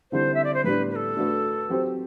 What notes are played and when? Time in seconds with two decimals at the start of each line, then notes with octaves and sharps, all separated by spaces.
0.11 D3 G3 C4 E4 C5
0.34 E5
0.44 D5
0.54 C5
0.64 A2 G3 B3 D4 B4
0.90 B4
0.95 A4
1.17 A3 D4 F#4 B4
1.69 F#3 C4 G4 C5